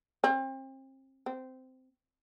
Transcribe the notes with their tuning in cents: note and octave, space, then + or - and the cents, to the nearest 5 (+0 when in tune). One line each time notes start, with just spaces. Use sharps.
C4 +35
C4 -15